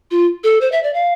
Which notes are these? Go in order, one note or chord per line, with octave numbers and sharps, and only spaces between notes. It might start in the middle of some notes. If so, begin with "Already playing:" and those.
F4
A4
C5
E5
D5
F5